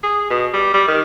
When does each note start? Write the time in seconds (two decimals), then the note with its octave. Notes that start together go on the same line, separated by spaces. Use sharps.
0.03 G#4
0.30 B2
0.53 G3
0.74 G3
0.87 D#3